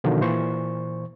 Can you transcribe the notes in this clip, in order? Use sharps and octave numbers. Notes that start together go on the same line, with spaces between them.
B2 D3 D#3 F3 F#3 B3
A#2 E3 C5 C#6